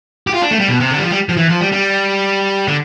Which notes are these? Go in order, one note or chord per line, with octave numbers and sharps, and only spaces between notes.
G4
F4
D4
A3
G3
B2
C3
D3
G3
F3
G3
F3
E3
F3
G3
G3
D3